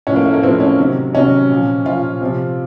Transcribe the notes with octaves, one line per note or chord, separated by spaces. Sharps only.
A2 F3 C#4
A#3
A3
A#3
A2 F3 C4
C#4
C3 D#3 F#3
C3 D#3 F#3 C#4
A#2 F3
A#2 F3 F4
C3 F3